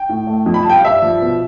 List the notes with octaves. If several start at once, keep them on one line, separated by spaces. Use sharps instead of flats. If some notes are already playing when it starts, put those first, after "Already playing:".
Already playing: G5
A2
A3
F2
B5
A5
G3 G5
F5
G2 E5
F3
B2